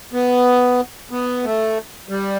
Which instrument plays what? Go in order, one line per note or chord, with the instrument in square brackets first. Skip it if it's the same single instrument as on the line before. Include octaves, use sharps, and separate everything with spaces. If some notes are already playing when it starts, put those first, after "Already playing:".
[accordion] B3
B3
A3
G3